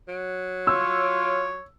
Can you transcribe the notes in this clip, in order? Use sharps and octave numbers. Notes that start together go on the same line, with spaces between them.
F#3
F4 C#5 E6